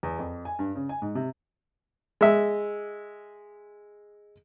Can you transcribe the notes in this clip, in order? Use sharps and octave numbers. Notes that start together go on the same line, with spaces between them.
E2
F2
G#5
G2
C#3
G#5
G#2
C3
G#3 E5